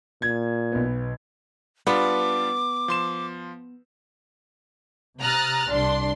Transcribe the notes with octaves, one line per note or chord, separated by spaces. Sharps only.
A#2 G#6
B1 B3
G3 B3 D4 F4 D6
F3 C6 E7
C3 A#5 D#6 F6 F#6 A6
C2 D4 C6